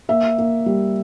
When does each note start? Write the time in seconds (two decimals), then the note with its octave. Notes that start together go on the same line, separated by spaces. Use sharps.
0.09 A#3 E5
0.38 A#3
0.66 G3